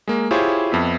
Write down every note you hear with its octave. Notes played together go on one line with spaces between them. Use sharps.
G#3 A#3
E4 F4 G4 G#4 C5 C#5
F2 B3 E5